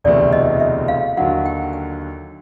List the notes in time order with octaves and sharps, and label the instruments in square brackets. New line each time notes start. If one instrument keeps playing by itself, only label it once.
[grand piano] E1 D2 C3 E3 A3 [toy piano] D5
[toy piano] D#5
E5
F5
[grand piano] D#2 D3 F#3 [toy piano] F#5
[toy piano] G5
G5
G5